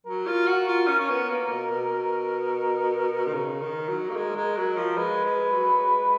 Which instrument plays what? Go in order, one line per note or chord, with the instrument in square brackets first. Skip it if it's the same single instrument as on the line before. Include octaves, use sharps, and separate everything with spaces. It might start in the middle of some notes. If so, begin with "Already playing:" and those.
[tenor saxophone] F#3 [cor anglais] A#4
[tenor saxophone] F4
F#4
F4
C#4
C#4
B3
A#3
B2
B2
D#3
[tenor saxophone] C#3 [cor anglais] A#4
[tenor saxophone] D#3
F#3
A#3
G#3
G#3
F#3
F3
[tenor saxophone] G#3 [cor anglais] B4
[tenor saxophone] G#3
F#3
G#3